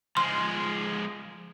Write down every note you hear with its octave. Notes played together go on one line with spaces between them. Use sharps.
F3 G#3 C6